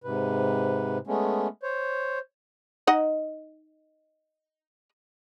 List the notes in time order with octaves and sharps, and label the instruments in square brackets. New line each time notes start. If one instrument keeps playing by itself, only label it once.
[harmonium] G#2 C3 B4
G#3 A3 B3 C#4
C5 C#5
[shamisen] D#4 D#5 F#5